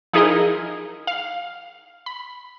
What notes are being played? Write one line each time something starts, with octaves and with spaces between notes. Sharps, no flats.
F3 D#4 E4 G#4 A#4 D#5
F5 C7
B5